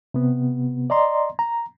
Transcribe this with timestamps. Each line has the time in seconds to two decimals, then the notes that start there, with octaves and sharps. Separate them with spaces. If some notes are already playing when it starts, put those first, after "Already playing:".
0.14 C3 B3
0.90 D5 D#5 A#5 C6
1.39 A#5